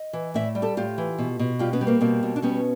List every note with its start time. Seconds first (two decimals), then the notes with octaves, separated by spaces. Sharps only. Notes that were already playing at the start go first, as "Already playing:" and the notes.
Already playing: D#5
0.13 E3
0.34 A2 D5 E5
0.55 G3
0.62 G4 A4
0.77 A2 F4 G4
0.98 E3
1.18 B2
1.39 B2
1.59 G3 F4 G4
1.73 B3 C#4
1.81 G3
1.87 A#3 C4
2.01 B2 A#3 C4
2.23 B2
2.36 D4
2.42 G3 B3 C#4